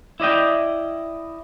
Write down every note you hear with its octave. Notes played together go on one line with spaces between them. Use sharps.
E4 D5 D#5 G5